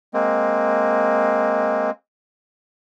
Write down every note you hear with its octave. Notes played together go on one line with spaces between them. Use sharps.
G#3 A#3 C4